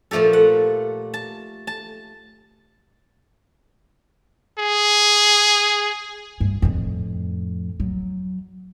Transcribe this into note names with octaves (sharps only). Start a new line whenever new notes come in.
A#2 F3 A3 G4 A4
F#5
A5
A5
G#4
G2
F2 A2
F#3